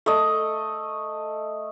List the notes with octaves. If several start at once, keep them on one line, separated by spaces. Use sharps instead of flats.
A3 D#5